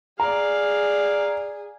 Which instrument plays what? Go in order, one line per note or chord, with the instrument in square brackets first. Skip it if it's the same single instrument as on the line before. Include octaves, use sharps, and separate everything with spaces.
[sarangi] G#4 [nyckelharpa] D5 F5 [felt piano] A#5